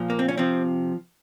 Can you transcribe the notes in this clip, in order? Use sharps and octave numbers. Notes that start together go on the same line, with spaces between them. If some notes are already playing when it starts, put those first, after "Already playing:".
Already playing: A#2 F3
A#3
C4
C#4
C3 F3 C4